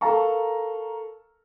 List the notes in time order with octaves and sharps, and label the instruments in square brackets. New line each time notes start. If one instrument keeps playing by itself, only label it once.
[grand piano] A4 A#4 F5 A5 A#5 C#6